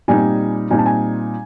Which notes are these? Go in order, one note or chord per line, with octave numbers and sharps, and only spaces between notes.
A#2 G3 C4 D#4 G#5
A#2 G3 C4 D#4 G#5
A5
G#5